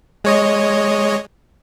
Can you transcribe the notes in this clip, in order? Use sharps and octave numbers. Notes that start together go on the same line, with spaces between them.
G#3 C#5 D#5